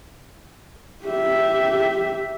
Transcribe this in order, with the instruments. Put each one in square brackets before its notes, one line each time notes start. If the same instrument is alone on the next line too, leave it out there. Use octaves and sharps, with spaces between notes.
[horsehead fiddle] G4 E5